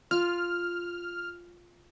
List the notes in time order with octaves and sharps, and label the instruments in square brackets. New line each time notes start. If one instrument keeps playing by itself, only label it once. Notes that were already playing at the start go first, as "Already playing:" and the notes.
[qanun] F4 [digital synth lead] F6